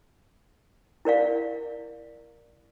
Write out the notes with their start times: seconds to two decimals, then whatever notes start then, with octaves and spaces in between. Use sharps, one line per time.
1.05 E4 A#4 D5 F5